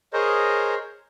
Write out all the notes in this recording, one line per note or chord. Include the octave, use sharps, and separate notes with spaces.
G#4 A#4 C5 C#5 D#5